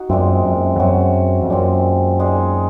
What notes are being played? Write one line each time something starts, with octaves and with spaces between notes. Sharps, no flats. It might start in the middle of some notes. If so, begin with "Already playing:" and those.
Already playing: D#4 F#4
F#2 A#2 G#3 C4
F#2
F2
F#2 F#3 C4 F#4
F2
F#2 A#2 G#3 C4
A#2 G#3 D#4 G#4